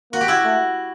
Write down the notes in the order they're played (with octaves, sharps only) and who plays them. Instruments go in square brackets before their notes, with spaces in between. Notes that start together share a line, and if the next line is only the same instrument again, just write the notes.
[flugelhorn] A#3 [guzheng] F#4
[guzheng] G4
E4 F#4
[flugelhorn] A3